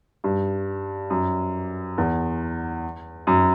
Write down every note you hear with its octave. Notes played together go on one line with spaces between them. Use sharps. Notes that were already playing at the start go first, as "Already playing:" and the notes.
G2
F#2
E2
F#2